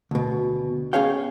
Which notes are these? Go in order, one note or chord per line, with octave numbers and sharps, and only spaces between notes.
D2 B2
B3 C#4 G#4 C#5 F5 G5